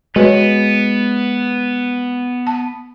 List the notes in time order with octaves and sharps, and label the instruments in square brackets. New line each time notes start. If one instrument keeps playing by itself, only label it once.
[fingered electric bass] G#3 [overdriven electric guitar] B3 [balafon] F#4 B4 C#5
[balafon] A5